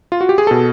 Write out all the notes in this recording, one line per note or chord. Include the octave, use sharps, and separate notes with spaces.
F4
F#4
G4
G#4
B2 A4